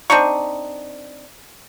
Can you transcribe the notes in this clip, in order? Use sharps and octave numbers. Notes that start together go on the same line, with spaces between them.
C4 D4 D#4 C#6